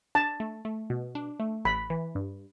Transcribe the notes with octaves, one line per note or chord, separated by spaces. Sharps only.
D4 A5
A3
A3
B2
D4
A3
A1 B5
E3
G2